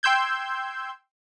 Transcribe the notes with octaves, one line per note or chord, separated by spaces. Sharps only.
G5 C6 E6 G6 G#6